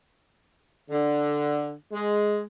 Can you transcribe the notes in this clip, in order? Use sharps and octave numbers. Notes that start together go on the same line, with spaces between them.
D3
G#3